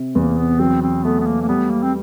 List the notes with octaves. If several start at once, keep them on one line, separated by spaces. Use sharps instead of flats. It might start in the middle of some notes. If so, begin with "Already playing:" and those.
Already playing: C3
E2 A#3
B3
F#3 C4
C4
A3 B3
B3
A#3
A#3
G3 B3
A#3
C4